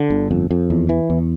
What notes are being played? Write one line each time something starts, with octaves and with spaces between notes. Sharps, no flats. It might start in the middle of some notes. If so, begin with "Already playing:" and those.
Already playing: D3
G1
F2
F2
E2
E3
E2